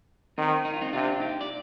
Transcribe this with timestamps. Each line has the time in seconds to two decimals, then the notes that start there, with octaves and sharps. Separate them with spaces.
0.38 D#3 C4 D#4
0.65 D#4
0.73 F4
0.81 C4 D#4
0.93 C3 D4 F4
1.20 D#4 G4
1.41 D5